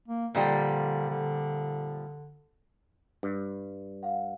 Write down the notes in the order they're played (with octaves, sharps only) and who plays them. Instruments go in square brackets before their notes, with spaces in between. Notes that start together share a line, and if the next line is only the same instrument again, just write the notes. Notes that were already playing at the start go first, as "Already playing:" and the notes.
[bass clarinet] A#3
[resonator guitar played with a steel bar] A#2 F3 G3 [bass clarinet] D3
[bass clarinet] D3
[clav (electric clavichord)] G2
[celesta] F5 F#5